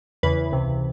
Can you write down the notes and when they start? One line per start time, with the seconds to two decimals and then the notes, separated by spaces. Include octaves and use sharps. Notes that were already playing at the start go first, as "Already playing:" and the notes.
0.23 E2 C#3 E3 B4
0.52 C#2 C3 E3